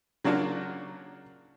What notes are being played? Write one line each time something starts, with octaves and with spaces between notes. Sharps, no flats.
C#3 F#3 A#3 D4 F4 F#4